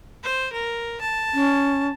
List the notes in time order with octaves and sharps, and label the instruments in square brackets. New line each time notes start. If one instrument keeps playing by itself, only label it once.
[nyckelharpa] C5
A#4
A5
[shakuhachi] C#4